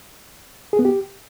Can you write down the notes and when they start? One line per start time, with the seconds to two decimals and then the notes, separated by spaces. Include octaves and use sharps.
0.73 G#4
0.79 B3
0.85 G4